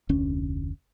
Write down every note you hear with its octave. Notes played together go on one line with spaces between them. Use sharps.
F1 D2 C#4